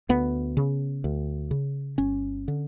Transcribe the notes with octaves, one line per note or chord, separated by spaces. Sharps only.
D2 B3
C#3
D2
C#3
G1 C#4
D3